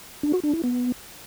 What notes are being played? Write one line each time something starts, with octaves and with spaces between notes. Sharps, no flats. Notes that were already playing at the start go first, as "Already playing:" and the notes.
D4
F#4
D4
E4
B3